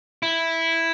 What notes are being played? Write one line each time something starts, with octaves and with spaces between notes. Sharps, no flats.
E4